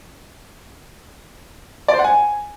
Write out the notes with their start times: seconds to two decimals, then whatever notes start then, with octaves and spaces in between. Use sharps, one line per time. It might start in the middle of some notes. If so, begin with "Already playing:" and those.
1.88 D5
1.94 C5
1.99 F#5
2.04 G#5